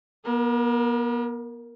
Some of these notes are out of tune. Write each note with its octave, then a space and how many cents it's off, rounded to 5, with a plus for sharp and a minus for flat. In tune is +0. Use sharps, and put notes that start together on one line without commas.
B3 -45 A#4 +0